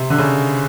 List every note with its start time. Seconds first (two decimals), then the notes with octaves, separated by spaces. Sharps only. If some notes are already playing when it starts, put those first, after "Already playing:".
Already playing: C3
0.10 D3
0.19 C#3